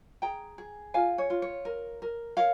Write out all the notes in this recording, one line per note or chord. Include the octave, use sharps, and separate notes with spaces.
G#4 G5 A#5
G#4
F4 F5 G#5
C#5
F4
C#5
A#4
A#4
A#4 C#5 F5